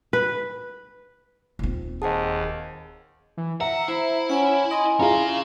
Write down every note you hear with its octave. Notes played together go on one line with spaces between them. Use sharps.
B4
D#1 C4
D#2 G#4 C5 D#5 F#5 A5
E3
E5 F#5 A#5
E4 C5
C#4 F#5 G#5
D#5 G#5 C6
C#4 E4 F4 G#4 F5 A#5